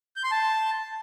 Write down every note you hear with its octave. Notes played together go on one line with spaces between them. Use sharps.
G6
C6
A5